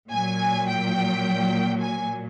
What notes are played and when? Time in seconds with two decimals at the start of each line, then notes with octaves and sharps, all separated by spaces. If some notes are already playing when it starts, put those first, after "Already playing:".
0.10 A#2 F#3 G#5
0.68 G5
1.81 G#5